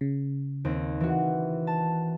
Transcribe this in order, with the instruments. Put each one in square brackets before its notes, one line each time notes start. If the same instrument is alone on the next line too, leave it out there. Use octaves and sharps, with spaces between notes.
[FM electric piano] C#3
[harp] D#2 C4
E3 F#4
A5